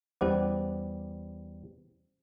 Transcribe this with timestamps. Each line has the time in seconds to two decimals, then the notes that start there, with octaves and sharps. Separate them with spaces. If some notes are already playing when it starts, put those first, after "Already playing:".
0.21 E2 G3 C#4 C5 F#5 D6